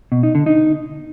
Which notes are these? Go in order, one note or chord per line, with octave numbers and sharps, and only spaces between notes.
B2
D#4
D3
D#4